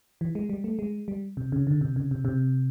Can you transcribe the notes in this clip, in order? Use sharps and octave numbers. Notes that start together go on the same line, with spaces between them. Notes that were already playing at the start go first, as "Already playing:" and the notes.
E3
G#3
G3
A3
G#3
G3
C3
C#3
D3
C3
C#3
C3
C3